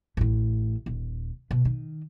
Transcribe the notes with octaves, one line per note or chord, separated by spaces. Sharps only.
A1 A2
D#1
B2
D#3